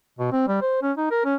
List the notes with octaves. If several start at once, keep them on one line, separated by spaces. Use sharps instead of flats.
B2
C4
G3
C5
C#4
D#4
A#4
C#4